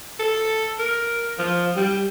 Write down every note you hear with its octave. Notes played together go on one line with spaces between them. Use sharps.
A4
A#4
F3
G3